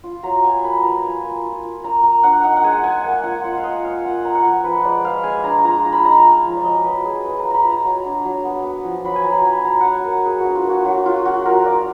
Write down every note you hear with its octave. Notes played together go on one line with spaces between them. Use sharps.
F4
F#3 A#5
B3 G#5
A#3 B5
F4 A#5
F4 G#5
A#3
F4
F4
A#3 A#5
A#3 A#5
D4 F#5
D#4 F#5
F#5
G#3 G#5
G#3 G#5
A#3 F#5
F4 F#5
F4 F#5
F5
A#3 D#5
A#3 F5
F4 F#5
B3 A#5
F#5
F3 G#5
F3 B4
G#3 D5
G#3 F5
G#3 G#5
D4 A#5
F4 A#5
F4
B5
D#4 A#5
G#5
D#4
F3
D5
F#3 D#5
F#3 B4
F#3 G#4
F4 B4
A#5
F4
A#5 B5
F4
A#5
F#3
D4
F#3
B3
B3
F3
F#3 B5
G#5
F#3 A#5
F#3 B5
F#3 A#5
F#3 F#5 G#5
B3 A#4
A#3 G#4
D4 F#4
F4
A#3 F#4
F#3 F#4
F#3 F4
F#3 F#4
F4 A#4
F4 D5